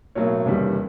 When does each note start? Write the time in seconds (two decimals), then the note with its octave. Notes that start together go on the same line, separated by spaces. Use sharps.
0.15 B1 A2 F#3 A#3 C#5
0.45 F1 D#2 C#3 E3 G3